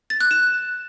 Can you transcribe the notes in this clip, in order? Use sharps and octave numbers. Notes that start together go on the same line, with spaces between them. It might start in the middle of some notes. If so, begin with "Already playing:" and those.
A6
F#6
E7